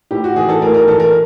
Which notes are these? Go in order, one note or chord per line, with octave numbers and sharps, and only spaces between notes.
A2 G4
F#4
E3 G#4
A4
A2 A#4
A#4
E3 A4
A#4